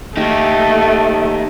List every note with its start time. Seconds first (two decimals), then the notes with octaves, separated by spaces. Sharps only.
0.17 A3 D#4 G4